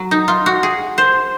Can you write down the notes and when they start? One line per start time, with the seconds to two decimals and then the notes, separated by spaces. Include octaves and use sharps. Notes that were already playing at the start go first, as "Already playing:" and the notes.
Already playing: F#3
0.11 D#4
0.28 F4
0.46 F#4
0.63 G#4
0.98 C5